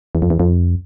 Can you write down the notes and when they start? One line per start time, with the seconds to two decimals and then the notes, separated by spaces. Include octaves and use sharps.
0.15 E2
0.22 F2
0.30 E2
0.40 F2